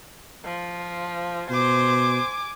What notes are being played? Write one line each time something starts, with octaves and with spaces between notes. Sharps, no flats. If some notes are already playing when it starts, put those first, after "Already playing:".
F3
B2 C5 G#5 D6